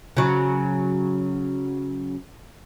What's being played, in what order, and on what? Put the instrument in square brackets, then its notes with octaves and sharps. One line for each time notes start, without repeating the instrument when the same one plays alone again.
[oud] C#3 F#3